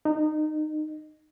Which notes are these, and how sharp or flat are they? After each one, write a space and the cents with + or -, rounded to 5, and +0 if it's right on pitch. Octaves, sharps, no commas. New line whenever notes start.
D#4 -20